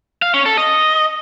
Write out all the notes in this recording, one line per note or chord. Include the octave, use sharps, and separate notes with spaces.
F5
C#4
A4
D#5